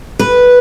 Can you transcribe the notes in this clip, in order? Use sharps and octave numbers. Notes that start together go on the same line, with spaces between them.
B4